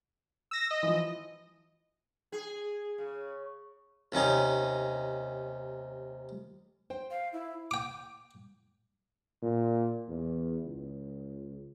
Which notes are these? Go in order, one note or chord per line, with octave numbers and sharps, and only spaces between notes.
E6 A#6
D#5
E3 F3
G#4
C#3
D#2 C3 C#4 D#4
C5 G5
F5
E4
G5 D6
A#2
E2
C#2